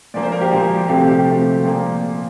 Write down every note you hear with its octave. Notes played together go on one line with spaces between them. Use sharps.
A#2 F3 A#3 D5
C5
A#4
G4
A#2 F3 A#3
C3 F3 A3 C4 G4
G4
C3 F3 A3 C4
A#2 F3 A#3